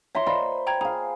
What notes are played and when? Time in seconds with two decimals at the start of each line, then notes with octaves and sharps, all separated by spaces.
0.15 C#5 E5 A#5 C6
0.27 C5 D5 D#5 F5 B5
0.67 G5 A#5 G#6
0.81 G#4 F5 G#5 A#5